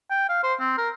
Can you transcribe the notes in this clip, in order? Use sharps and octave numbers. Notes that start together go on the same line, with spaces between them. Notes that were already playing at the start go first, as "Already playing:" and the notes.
G5
F5
C5
C4
A#4